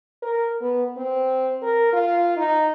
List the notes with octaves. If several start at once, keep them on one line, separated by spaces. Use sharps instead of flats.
A#4
B3
C4
A#4
F4
D#4